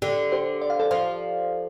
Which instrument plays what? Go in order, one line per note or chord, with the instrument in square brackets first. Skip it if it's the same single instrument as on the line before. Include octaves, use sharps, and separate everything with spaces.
[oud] D3 [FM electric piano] G4
[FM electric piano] G4 C5
D5
F5
A4 D5
[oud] F3 [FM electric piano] C5 F5